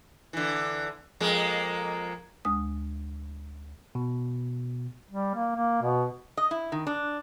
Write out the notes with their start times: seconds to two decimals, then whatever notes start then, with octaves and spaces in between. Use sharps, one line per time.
0.33 D3 E3
1.20 F2 G#3 A#3
2.45 D2 G#3 D#6
3.95 B2
5.11 G3
5.35 A#3
5.56 A#3
5.82 B2
6.37 D#5
6.51 E4
6.72 D#3
6.87 D4